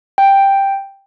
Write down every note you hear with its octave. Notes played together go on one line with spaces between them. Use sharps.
G5